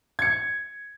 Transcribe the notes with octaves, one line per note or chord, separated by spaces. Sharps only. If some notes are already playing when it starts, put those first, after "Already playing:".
G#6 C#7